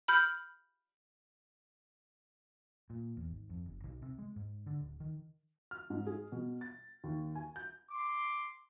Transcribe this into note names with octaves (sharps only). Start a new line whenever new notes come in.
B5 F6 G6
A#2
E2
G#1
F2
F#1
B1
C3
G#3
G#2
D3
D1
D#3
F6
G#2
G#4
B2
A6
D#2
G#5
G6
C6 D6